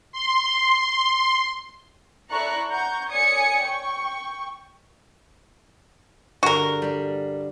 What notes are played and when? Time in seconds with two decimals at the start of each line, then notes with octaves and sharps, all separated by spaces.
0.12 C6
2.31 E4 A4 D5 A#5 C#6 F#6
2.69 F#5 A#5 C#6 G6
3.10 C#5 D5 G#5 D#6 G#6 C#7
3.62 G5 C#6
6.43 G2 D3 F#4 A#4
6.82 G3 D4